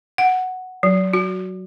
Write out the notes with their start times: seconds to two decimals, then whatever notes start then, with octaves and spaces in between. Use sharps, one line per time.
0.18 F#5
0.83 F#3
1.13 F#4